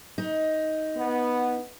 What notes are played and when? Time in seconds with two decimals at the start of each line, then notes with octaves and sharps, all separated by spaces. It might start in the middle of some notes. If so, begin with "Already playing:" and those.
0.18 D#4
0.96 B3